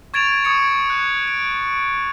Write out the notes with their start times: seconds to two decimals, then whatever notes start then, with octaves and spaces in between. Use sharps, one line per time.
0.14 C#6 G#6 A6 D7 E7 F7
0.45 C#6 D#6 G#6 C#7
0.90 F#6
1.28 D7